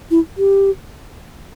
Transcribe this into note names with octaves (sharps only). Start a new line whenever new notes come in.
E4
G4